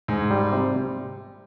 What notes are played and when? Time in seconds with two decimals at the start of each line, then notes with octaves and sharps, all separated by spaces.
0.08 G#2 G#4
0.31 G3
0.52 C3